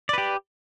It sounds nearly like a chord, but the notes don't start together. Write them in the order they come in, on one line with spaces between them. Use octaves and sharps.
D5 B4 G4